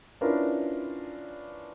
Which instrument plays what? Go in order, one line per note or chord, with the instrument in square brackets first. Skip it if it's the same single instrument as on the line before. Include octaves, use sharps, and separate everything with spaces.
[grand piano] C#4 D4 E4 F4 A#4 B4